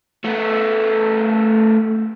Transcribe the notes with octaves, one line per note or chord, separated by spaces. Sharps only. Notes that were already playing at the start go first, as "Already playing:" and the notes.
A3 B3